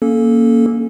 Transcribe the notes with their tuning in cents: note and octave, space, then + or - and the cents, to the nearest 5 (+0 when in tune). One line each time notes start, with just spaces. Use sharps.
A#3 +0 C#4 +0 A4 -15